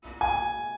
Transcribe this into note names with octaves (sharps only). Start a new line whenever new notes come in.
G#5